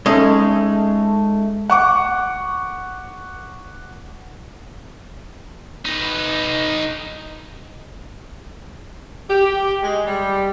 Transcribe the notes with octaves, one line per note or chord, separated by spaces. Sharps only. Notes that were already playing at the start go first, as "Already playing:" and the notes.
G#3 A3 C#4 D#4
F#5 C#6 D6
D#4 B4
G4
G#3
G3